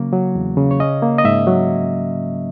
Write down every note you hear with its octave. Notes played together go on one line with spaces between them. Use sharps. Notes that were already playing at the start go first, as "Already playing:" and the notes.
Already playing: C#3 F#3 A#3
F#3
E2
C#3
C#5
C#4 D#5
A#3
D#5
G#2 E5
F#3